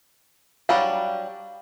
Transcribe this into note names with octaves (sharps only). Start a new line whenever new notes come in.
F#3 G3 D4 F5